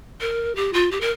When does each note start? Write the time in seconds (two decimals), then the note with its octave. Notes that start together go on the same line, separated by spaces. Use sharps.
0.21 A#4
0.55 G4
0.73 F4
0.91 G4
1.01 A#4